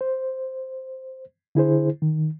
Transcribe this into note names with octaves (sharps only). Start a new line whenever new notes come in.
C5
D3 E4 G#4 C5
D#3